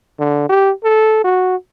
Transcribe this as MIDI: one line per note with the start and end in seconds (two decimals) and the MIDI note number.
0.19 0.47 50
0.49 0.71 67
0.84 1.21 69
1.24 1.56 66